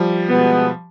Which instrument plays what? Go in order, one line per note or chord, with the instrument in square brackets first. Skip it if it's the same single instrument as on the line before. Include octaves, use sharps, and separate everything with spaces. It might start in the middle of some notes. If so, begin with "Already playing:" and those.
Already playing: [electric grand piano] F3 G3
[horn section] B2 G#3 B3